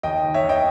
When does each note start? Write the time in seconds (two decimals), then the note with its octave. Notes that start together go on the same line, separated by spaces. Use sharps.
0.03 D#2 D#5 G5
0.24 D#3
0.34 C#5 E5
0.44 D#2
0.49 D#5 G5